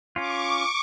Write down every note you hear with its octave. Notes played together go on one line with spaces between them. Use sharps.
C#4 F4 C#6 D6